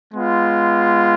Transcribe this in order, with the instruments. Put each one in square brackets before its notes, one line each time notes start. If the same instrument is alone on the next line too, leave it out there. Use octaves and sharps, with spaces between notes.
[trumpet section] G#3 B3 F4